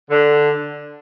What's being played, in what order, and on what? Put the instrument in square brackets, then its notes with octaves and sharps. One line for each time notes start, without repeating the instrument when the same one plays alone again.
[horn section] D3